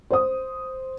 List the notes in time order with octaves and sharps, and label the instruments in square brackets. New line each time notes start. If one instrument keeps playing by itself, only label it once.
[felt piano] C5 D#6